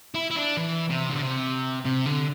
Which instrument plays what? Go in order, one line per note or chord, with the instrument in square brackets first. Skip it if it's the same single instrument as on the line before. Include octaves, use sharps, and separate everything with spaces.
[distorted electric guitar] E4
E4
D4
E3
C3
D3
C3
C3
D3